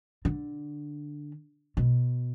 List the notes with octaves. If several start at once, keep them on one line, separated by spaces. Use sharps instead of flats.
D3
B2